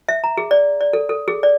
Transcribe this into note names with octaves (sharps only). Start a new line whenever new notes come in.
E5
A#5
G#4
D5
D5
A4
A4
G#4
D5